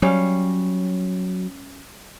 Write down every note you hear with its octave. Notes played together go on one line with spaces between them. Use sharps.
F#3 G3 C#4 F5